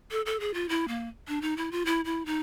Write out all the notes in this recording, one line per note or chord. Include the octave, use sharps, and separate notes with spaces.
A4
A4
G#4
F4
E4
A#3
D4
D#4
E4
F4
E4
E4
D#4